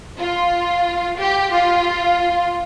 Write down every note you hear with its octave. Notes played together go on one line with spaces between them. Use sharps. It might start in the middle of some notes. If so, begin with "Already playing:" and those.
F4
G4
F4